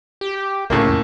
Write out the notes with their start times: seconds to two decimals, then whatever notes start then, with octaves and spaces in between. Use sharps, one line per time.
0.21 G4
0.70 C2 A2 C#3 A#3
0.89 F2